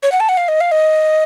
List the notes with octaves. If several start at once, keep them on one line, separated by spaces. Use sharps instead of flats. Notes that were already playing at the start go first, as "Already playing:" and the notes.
C#5
F#5
A5
F#5
F5
D#5
F5
D#5